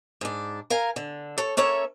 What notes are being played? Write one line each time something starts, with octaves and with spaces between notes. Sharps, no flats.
G#2 D4
A#4 F5 G#5
D3
A4 C#5
A#3 C#4 A4 C#5 E5